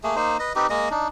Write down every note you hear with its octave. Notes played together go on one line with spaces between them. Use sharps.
A3 A#3 G#4
A#3 D#4 C5
B4 D#5
C4 D#4 G4 B4
G#3 A#3 D#5
D4 D#4